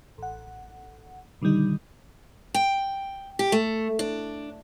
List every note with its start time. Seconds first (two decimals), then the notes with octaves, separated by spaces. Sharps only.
0.18 A1 F#5
1.42 B2 D3 D#3 G3 D#4
2.54 G5
3.39 G4
3.52 A3
3.99 D4